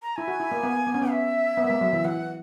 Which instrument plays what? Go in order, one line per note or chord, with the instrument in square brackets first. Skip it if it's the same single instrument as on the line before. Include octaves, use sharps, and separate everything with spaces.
[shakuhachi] A#5
[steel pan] E4 [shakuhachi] G#5
[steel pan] F#4
E4
A#3
B3
B3
C#4
B3
[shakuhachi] E5
[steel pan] B3
A#3
G#3
F#3
E3
[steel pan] E3 [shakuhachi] F#5